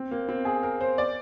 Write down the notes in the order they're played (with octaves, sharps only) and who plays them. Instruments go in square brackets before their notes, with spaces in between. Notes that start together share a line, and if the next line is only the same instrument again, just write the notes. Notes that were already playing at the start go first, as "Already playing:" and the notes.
Already playing: [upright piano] C4
A#3
C4
G#4
A#4
C5
D5